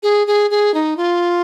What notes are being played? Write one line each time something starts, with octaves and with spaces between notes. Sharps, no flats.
G#4
G#4
G#4
D#4
F4